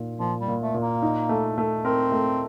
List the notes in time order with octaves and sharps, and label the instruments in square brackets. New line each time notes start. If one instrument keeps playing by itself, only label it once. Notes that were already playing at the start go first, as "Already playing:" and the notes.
Already playing: [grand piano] A#2 D#4
[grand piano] A#2 [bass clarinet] F3
[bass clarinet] G3
[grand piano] A#2
[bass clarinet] A3
[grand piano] A#2
[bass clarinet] A#3
[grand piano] D#4
A3
A3
[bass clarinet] C4 [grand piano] A#4
[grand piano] A3